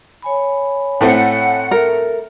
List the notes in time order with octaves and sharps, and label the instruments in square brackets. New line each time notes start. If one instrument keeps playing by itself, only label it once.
[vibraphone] C#5 G#5 B5
[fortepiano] A2 A3 C4 [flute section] F#5
[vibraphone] A4 E5 [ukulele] A#4